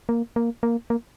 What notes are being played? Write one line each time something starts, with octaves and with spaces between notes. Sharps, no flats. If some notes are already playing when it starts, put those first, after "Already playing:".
A#3
A#3
A#3
A#3